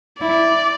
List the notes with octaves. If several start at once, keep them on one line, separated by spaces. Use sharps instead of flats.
E4 D5